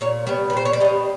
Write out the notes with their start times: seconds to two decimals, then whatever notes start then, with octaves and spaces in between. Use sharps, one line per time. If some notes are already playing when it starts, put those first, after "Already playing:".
0.01 A#2 C#5
0.27 G3 B3 C#5
0.50 B4
0.53 A#2 C5
0.65 C#5
0.73 D5
0.80 G3 D#5
0.85 B3